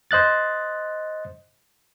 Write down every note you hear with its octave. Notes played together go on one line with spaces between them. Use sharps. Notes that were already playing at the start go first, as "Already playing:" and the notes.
C5 D#5 F#6 A6